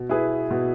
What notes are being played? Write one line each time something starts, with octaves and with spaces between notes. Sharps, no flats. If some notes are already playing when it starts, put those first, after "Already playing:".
Already playing: B2
B3 E4 G#4 B4
B2